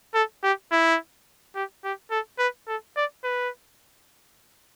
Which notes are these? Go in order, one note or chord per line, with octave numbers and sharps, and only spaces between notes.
A4
G4
E4
G4
G4
A4
B4
A4
D5
B4